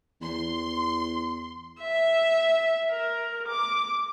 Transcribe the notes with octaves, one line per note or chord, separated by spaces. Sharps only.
E2 C6
E5
A#4
D6